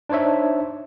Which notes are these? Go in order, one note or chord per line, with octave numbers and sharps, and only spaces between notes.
D4 D#4 C5 C#5 E5